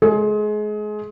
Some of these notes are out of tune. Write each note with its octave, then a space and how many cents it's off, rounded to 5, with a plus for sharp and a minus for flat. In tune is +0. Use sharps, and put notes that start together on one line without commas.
G#3 +30 G#4 +25